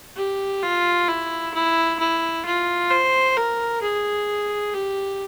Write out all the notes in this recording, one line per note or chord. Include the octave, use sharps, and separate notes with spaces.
G4
F4
E4
E4
E4
F4
C5
A#4
G#4
G4